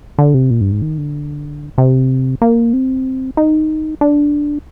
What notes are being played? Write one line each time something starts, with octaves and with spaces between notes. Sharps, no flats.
D3
C3
A#2
G2
G#2
D#3
D3
C3
A#3
C4
D#4
D4